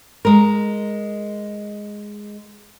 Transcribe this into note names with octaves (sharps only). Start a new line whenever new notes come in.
G#3 A#4